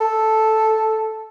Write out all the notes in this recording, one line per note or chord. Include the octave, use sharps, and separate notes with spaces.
A4